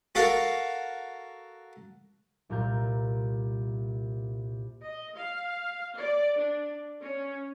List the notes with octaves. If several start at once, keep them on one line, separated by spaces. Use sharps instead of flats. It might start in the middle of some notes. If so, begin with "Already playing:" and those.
F#4 A4 A#4 F5
C2 A#2 A#4 G6
D#5
F5
D5
D4
C#4